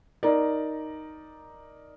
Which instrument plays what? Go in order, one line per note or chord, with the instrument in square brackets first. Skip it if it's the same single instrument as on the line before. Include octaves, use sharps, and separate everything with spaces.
[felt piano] D#4 A#4 D5